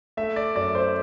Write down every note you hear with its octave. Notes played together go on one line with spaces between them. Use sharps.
A3 E5
D5
F#2 D5
C5